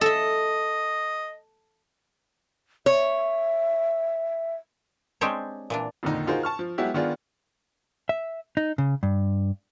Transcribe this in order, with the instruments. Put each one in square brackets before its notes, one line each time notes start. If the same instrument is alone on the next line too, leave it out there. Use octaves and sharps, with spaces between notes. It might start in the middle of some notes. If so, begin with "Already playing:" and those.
[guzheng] A4 E5 [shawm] D#5
[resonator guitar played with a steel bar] C#5 [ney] E5
[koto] G#3 C4 D4 G4 C5 C#5
A#2 E3 D4
[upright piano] F2 A#2 D3 D#3 D#4
D#4 F4 F#4 G#4 A#4 C5
A5 C#6 F6
F3
F#3 G#3 B3 E4 F#4 G4
D#3 B3 D4 F4 G#4
[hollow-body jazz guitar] E5
D#4
C#3
G2